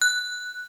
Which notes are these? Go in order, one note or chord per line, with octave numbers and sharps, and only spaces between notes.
F#6